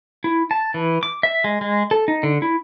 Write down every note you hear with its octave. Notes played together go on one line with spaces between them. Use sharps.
E4
A5
E3
D6
E5
G#3
G#3
A4
D#4
D3
E4